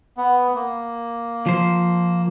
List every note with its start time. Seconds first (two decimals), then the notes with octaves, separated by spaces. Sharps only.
0.17 B3
0.55 A#3
1.46 F3 C5